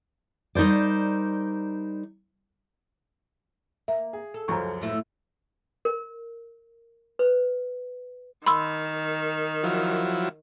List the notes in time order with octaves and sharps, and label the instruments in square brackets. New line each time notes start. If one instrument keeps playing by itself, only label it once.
[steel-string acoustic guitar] G3 D#4 A#4 C5 D5
[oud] A#3 [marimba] E5
[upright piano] G#4
[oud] A4
[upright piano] C#2 F#2 F3 [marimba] A#5 C#6
[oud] A2 A3 E4
[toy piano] A#4
B4
[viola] D#3 [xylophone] B5 C6 E6
[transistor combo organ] F3 F#3 E4